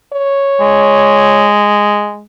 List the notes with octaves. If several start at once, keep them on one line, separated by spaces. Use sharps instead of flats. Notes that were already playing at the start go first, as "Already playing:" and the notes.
C#5
G#3